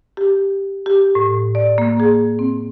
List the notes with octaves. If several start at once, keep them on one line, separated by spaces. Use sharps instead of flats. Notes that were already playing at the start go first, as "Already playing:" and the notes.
G4
G4
A2
D5
A#3
G#4
C4